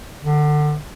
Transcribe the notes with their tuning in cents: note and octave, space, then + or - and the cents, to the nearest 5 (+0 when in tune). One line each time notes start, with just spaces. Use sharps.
D3 +25